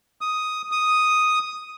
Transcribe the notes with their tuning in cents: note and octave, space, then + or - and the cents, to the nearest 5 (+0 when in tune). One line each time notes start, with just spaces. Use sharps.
D#6 +5
D#6 +0